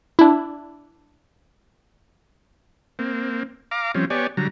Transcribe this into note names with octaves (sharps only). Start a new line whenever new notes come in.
D4 E4
A#3 C4
F5 A#5 D6
F3 G3 C4 C#4
B3 G4 C#5 D5 G#5
D3 F#3 G3 A#5